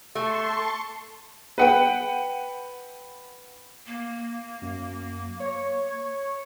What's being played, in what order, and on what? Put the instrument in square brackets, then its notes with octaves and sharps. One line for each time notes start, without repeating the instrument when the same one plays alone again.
[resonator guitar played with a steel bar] A3 [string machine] A5 C6 C#6
[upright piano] B4 F#5 G5
[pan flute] A#3
[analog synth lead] F#2
C#5